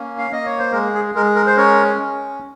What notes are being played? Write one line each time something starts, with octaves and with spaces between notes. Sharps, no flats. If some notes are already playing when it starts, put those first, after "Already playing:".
Already playing: A#3 C#4
F5
A#3 D#5
C#5
C5
G#3 A#4
G#4
G#3 A#4
A#4
C5
C#4 A#4 C#5
C#4